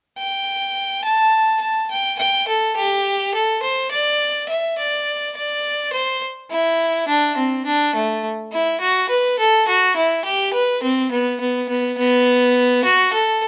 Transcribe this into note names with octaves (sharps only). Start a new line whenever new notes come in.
G5
A5
A5
G5
G5
A4
G4
A4
C5
D5
E5
D5
D5
C5
E4
D4
C4
D4
A3
E4
F#4
B4
A4
F#4
E4
G4
B4
C4
B3
B3
B3
B3
F#4
A4